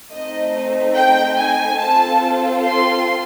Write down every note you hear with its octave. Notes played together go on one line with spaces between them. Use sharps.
A3 C4 D#4 D#5
G5
G#5
C4 F4 A4 A5
C6